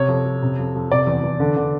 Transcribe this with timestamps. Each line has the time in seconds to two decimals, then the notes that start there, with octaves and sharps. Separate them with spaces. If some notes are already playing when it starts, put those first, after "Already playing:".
Already playing: C3 C#5
0.08 F2
0.25 F2
0.42 C3
0.59 F2
0.75 F2
0.91 C3 D5
1.07 E2
1.23 E2
1.40 D3
1.56 D3